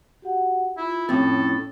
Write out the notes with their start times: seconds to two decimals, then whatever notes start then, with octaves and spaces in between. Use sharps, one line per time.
0.22 F#4 G4 F#5
0.77 E4 F4
1.09 F2 A2 C#4 A4 C#5